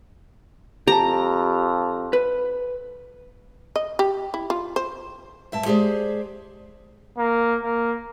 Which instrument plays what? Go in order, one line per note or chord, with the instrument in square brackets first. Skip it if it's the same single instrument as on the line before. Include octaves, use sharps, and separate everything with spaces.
[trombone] F2 [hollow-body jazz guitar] G4 A5 [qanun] A#5
[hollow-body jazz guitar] B4
[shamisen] D#5
G4
E4
F4
C5
[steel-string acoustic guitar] G2 E5 A5
G#3 G4 G#4 C5 D5
[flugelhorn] A#3
A#3